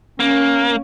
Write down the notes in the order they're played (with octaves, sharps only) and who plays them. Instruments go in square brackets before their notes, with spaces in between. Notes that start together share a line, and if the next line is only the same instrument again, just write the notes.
[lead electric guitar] A#3 [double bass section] C#4